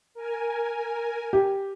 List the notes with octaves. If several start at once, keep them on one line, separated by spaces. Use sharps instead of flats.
A#4 G#5
G4